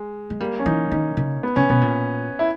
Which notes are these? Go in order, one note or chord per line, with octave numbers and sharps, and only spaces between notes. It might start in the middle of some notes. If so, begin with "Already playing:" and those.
Already playing: G#3
G#3
G3 A#3
C#4
E3 D#4
D#3 D#4
C#3
B3
C#3 C#4
B2 B3
A#2
E4